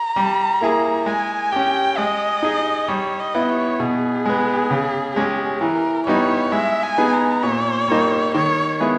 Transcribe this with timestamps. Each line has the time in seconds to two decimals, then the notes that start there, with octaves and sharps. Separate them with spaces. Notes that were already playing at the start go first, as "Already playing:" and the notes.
Already playing: A#5
0.16 G3
0.61 A#3 E4 G#4
1.06 G#3 G#5
1.52 C#4 G4 G5
1.97 G#3 D#5
2.43 D#4 G#4
2.88 G3 C#5
3.20 D#5
3.35 B3 E4
3.49 C#5
3.79 B2 G#4
4.25 G#3 B3
4.71 C#3
5.16 G#3 C#4 G4
5.61 E3 A#4
6.06 G3 B3 D#4 C#5
6.52 G#3 E5
6.83 G#5
6.98 B3 D#4 G#4
7.13 A#5
7.43 A#2 C#5
7.88 G3 A#3 D#4
8.35 D#3 C#5
8.80 G#3 B3 E4 G#4